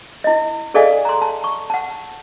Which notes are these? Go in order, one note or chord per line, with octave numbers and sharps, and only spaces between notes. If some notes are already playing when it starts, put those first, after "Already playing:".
E4 D#5
G#4 A4 D5 D#5 F5 G#5
A#5 C6
A5
C#6
F#5 A5